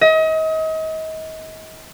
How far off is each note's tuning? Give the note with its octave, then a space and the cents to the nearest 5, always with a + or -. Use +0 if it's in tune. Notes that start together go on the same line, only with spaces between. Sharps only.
D#5 +35